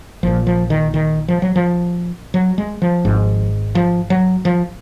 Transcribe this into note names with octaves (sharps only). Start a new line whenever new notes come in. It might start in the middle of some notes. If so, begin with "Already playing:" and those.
A#1 A#2 F3
F3
D#3
D#3
F3
F#3
F3
F#3
G#3
F3
G#1 G#2
F3
F#3
F3